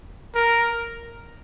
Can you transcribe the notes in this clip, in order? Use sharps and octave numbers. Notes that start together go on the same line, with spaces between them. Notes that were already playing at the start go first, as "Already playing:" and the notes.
A#4